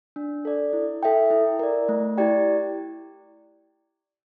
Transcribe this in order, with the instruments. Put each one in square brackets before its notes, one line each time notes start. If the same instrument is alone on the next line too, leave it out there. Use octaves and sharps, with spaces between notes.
[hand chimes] D4
A4 D5
E4
A4 E5 G5
E4
A#4 D5
A3
E4 G4 D5 G5